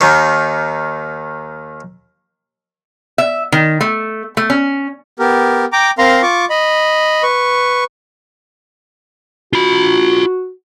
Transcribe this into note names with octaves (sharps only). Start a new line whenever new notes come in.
D#2 D#3
E5
D#3
A3
A3
C#4
B3 G4 A#4
G5 A#5 D6
C4 A#4 F5 A#5 C6
F4 C#6 D6
D#5 B5
B4 C#6
F4 F#4 B5